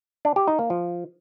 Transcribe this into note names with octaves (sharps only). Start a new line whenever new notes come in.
D4
G4
D#4
A#3
F3